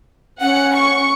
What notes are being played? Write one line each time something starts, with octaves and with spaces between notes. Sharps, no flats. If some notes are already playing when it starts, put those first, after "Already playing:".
C#4 F#5
C#6